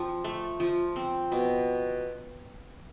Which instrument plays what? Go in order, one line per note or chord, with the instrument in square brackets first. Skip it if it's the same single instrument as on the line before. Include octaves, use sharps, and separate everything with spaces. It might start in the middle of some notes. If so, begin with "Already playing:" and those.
Already playing: [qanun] F3 C4
A3
F3
C4
B2